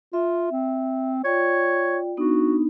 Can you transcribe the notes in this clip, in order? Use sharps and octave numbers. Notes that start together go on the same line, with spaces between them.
F4 E5
C4
F4 C#5 D5 G5
B3 D4 D#4 F#4